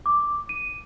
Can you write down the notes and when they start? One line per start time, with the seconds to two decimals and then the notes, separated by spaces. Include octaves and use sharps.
0.06 D6
0.49 D#7